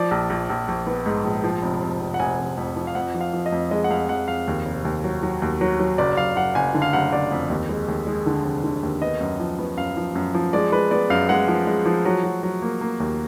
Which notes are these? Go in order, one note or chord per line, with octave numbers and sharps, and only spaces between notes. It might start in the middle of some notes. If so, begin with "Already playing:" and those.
Already playing: F3 D5
A#1
A#1
A#1
A#1
B3
G#2
A#1
F3
F1
F1
F1
F#5
F1 G#5
F1
F2
F3
F5
F2 F#5
F3
F5
F3
D#5
F2
G#3 D#5
F#5
F2 F5
F2 F#5
F2 F5
D#2
F1
D#2
F#3
F#3
D#2
F#3
F#3
F#1 D5
F#1 F5
F#1 F#5
F#1 G#5
D3
F5
F#1 F#5
F#1 D5
F2
D#2
G#3
D#2
G#3
D3
F1
D3
D#2
B3 D#5
F#2
F3
B3
F#2 F5
F3
F#2
F3
G#3 D5
G#3 B4
B3 D5
F#2 F5
G#3 F#5
F3
G#3
F3
F#3
F#3
F#3
A#3
A#3
D#2